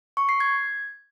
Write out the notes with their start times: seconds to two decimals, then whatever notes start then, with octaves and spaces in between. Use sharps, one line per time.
0.17 C#6
0.29 C7
0.40 G#6